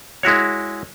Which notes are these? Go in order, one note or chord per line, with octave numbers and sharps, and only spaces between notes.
G#3 E4 F#4 C#5